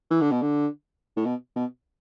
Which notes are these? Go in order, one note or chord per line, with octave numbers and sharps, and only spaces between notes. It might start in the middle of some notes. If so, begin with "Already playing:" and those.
E3
D3
B2
D3
A2
B2
B2